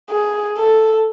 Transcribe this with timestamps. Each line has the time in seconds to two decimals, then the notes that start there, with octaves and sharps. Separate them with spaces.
0.10 G#4
0.58 A4